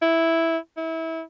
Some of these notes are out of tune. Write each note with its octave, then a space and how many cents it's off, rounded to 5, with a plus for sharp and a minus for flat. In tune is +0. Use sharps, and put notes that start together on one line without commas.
E4 -5
E4 -25